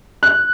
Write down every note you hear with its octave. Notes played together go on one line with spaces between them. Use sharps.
F#6